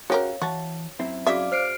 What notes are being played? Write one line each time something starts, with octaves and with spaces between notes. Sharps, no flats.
C#3 F#4 G4 A#4 C#5 F5
E3 F#4 A5
F#2 C4 E4
C#3 F#4 G#4 D5 E5 F5 D6
C5 F6 C7 D7